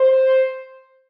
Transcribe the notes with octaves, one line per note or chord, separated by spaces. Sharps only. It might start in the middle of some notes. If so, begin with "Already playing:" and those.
Already playing: C5